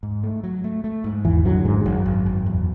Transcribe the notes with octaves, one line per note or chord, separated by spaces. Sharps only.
G#2
A3
F#3
A3
A3
G#2
G#1 E2 E3
F#2 D3 F#3
G#1 G#2 G#3
G#1 F#2 F#3
G#1
G#1
E2